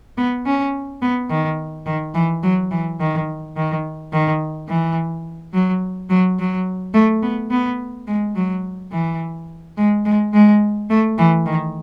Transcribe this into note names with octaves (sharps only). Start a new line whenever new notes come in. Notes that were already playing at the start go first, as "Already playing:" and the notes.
B3
C#4
B3
D#3
D#3
E3
F#3
E3
D#3
D#3
D#3
E3
F#3
F#3
F#3
A3
B3
B3
G#3
F#3
E3
G#3
G#3
G#3
A3
E3
D#3